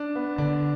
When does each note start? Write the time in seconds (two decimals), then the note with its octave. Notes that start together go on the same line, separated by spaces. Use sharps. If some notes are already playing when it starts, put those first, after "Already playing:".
Already playing: D4
0.15 B3
0.38 D3 D4